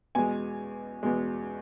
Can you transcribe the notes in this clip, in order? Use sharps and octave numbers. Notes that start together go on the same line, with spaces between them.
E2 B2 G#3 G#5
E2 B2 G#3